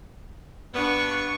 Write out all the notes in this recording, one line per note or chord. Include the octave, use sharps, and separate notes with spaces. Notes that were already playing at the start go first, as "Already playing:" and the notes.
G2 B3 D4 C#6